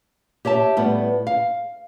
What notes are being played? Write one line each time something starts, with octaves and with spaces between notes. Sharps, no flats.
G4 C#5 E5 A5
A2 G3 B3
F5